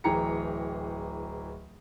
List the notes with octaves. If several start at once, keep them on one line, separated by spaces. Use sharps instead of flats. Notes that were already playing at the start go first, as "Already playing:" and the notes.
D1 E3 G#4 G5 A#5 C#7